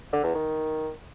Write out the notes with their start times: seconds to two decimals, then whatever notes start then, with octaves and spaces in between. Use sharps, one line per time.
0.12 D3
0.23 E2
0.34 D#3